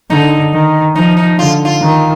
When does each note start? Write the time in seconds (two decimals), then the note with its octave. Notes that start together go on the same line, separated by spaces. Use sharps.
0.10 D3 D#4
0.53 D#3
0.95 F3 D#4
1.17 D#4
1.38 D3 F4
1.65 F4
1.81 D#3